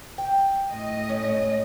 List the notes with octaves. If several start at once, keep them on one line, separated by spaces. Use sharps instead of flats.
G5
A2 D#5
C#4